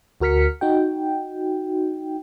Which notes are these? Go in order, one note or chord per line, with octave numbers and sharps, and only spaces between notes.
D2 F#4 A#4 F6 B6 C#7
D#4 F#4 G5